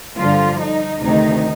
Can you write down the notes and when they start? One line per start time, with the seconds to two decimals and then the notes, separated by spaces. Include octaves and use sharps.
0.17 G2 D3 F3 F4
0.60 D#4
1.02 D2 C3 D#3 D#4